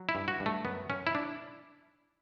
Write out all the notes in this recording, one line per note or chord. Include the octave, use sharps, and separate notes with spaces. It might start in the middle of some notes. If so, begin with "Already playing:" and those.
Already playing: F#3
E4
G2
F#4
G2
A3
F#2 B3
F#2 C#4
E4
D4